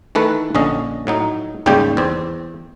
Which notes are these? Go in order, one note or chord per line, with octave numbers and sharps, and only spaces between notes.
D#3 E3 A3 A4 B4
A#1 D3 C#4 D#5
A2 F#3 D#4
G#1 D#2 C#3 G3 G4 G5
E2 C4